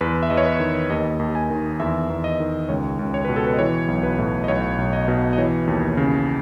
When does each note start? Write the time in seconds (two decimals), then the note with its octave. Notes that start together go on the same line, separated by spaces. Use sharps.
0.01 E2 B4
0.23 E5
0.30 E2 D#5
0.37 C#5
0.46 B4
0.60 D#3
0.90 D#2 D#5
1.19 D#2
1.35 G#5
1.50 D#3
1.80 E2 E5
2.10 E2
2.24 D#5
2.40 D#3
2.69 C#2 C#5
2.99 C#2
3.14 C#5
3.25 B2 B4
3.36 A4
3.47 B4
3.53 D#5
3.59 E3 C#5
3.88 B1
4.03 B4
4.19 A2
4.44 D#5
4.48 B1 C#5
4.78 B1
4.93 D#5
5.08 B2
5.33 D#5
5.38 E3 C#5
5.67 D#2
5.97 C#3